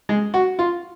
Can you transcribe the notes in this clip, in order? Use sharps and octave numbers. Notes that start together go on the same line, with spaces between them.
G#3
F#4
F4